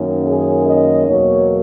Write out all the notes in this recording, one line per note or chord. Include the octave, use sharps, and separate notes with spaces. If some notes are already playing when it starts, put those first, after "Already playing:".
Already playing: F#2 D#3 A#3 C#4
G#4
D#5
E2 B2 F#3 A#3 C#5